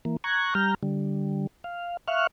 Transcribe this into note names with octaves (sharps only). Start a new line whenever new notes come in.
E3 A#3
A#5 C#6 F#6 G#6
G3 A#5 F6 G6
D3 G3
F5
E5 F5 C#6 F6 F#6